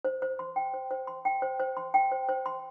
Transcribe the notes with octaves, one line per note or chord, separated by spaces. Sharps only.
C5
C5
C6
G5
C5
C5
C6
G5
C5
C5
C6
G5
C5
C5
C6